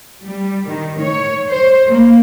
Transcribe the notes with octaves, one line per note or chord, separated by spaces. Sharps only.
G3
D#3
C#5
C5
A#3